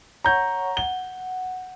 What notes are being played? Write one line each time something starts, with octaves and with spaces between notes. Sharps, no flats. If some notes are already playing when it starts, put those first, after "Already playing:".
C#5 F#5 A#5 C#6 G6
F#5 G7